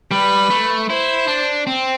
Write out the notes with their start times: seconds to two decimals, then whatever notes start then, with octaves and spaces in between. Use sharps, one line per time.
0.11 G3 B4
0.50 A3
0.89 E4 C5
1.28 D4
1.67 C4